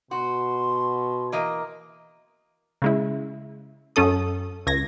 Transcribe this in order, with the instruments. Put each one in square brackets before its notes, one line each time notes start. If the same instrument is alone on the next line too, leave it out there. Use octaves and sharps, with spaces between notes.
[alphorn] B2 [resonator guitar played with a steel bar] F#4 [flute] C6
[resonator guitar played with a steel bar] E3 A#3 D#5
[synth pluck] C#3 G#3 E4
F#2 C#4 A4 D#6
C#2 G#6 A#6